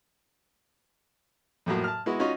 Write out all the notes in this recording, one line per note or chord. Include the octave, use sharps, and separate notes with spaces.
F2 A2 F#3 A#3
A5 F6
G#3 B3 E4 F#4
C#4 D#4 F4 F#4 D#5